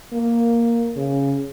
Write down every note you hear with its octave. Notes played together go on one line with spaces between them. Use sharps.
A#3
C#3